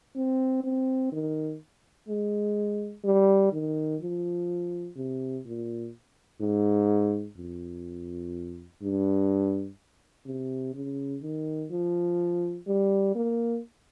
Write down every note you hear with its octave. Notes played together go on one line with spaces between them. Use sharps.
C4
C4
D#3
G#3
G3
D#3
F3
C3
A#2
G#2
F2
G2
C3
C#3
D#3
F3
G3
A#3